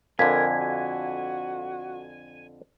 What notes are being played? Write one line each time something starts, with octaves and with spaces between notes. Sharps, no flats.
F2 D3 A#4 F5 G#5 G#6 B6
F#4